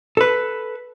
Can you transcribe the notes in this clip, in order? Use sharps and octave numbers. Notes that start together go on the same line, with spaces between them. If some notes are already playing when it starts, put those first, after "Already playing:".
A4 B4